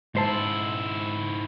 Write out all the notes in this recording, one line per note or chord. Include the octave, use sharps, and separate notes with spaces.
C#2 G#2 E4 C5 A5